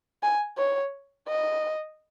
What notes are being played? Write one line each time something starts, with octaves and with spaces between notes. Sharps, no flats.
G#5
C#5
D#5